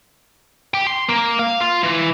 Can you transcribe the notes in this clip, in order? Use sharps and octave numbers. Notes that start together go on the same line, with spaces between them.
G4 G5
C6
A#3
F5
F4
E3